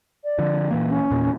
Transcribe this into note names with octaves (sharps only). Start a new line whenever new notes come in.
D5
D3 F3
A#2 E3 A#3
C#4
E2 A#2